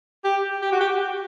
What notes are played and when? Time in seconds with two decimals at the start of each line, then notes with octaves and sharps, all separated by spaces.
0.24 G4
0.62 G4
0.72 F#4
0.81 G4